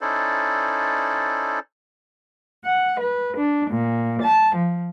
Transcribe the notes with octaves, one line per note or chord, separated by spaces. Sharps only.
C#4 D#4 E4 A4 C5 D5
F#5
B4
D4
A#2
A5
F3